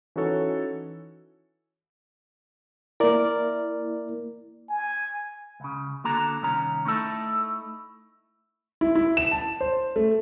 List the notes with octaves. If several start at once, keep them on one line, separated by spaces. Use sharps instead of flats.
E3 C#4 D#4 F#4 A4 C#5
A#3 E4 A#4 D5
G#5
C#2 C#3
D3 A#3 F#4 A4 A#5
C2 D#3 C#4 A#5
A3 C#4 D#4 E4 A4 A5
E4
E4
E7
A5
C5
A3